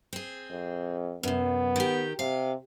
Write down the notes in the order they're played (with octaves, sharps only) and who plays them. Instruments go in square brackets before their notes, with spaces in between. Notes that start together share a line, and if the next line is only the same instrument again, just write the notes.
[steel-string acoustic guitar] C4 G#4
[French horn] F2
[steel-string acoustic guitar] F#2 C3 [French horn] B3
[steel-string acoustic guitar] D#3 G4
[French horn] C3 [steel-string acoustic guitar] F5